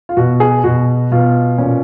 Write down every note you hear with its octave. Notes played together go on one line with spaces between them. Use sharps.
F4
B2 F#4
G#4
B2 F#4
B2 F4
A#2 C#4